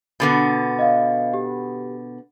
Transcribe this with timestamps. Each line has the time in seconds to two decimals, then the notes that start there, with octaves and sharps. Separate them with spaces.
0.20 B2 D3 B3
0.79 D#5 F5
1.34 G4